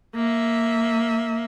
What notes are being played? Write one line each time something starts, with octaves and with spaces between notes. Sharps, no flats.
A#3 E5